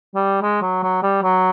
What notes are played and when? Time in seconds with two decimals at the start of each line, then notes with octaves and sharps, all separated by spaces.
0.15 G3
0.42 G#3
0.62 F#3
0.83 F#3
1.03 G3
1.23 F#3